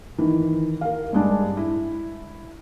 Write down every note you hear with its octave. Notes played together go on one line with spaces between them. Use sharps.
D#3 E3
A#4 F5
G2 G#3 D4
E4